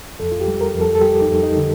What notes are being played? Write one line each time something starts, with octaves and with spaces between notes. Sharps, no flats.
F2 A4
F4
G4
G3
A#4
F2
A4
A4
G3 G4
D#4
F2
D#4
D3